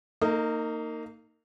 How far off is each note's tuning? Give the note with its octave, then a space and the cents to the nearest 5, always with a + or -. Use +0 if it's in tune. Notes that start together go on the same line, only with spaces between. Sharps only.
A#3 -25 D#4 +0